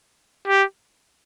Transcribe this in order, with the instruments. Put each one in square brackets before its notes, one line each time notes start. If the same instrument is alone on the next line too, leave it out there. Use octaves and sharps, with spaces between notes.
[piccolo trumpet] G4